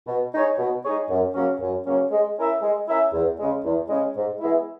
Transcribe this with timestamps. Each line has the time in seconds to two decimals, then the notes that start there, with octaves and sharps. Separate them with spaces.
0.07 B2
0.33 G#3 D#4 G#4 C#5
0.58 B2
0.84 G#3 D#4 G#4 C#5
1.10 F#2
1.35 C#3 F#3 A#3 C#4
1.61 F#2
1.86 C#3 F#3 A#3 C#4
2.11 G#3
2.36 C#4 E4 A#4 E5
2.62 G#3
2.88 C#4 E4 A#4 E5
3.13 E2
3.39 C#3 G#3
3.64 E2
3.89 C#3 G#3
4.16 G#2
4.40 E3 G#3 B3 E4